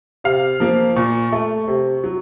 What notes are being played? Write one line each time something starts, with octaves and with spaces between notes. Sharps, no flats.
C3 F5
F3 A#3
A#2 C#6
A3
C3
F#3